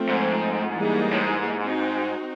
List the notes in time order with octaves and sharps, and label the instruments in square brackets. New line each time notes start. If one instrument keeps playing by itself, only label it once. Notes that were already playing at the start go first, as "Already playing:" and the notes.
Already playing: [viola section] F3 A3 C4
[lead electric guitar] G#2
[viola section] E3 G3 A#3 D#4 G#4
[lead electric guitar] A2
G#2
[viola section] C4 D#4 F#4